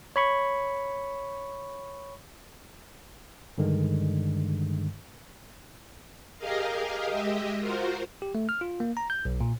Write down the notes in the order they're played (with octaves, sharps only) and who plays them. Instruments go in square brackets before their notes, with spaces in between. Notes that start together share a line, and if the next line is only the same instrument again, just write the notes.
[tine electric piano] C#5 B5 C#6
G2 D3 D#3 G#3
[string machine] G4 G#4 A#4 D#5 F5
G#3 G4 D#5 E5
F4 F#4 A#4 C5
[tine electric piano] G4
A3
F6
F4
A#3
A#5
G6
B1
A#2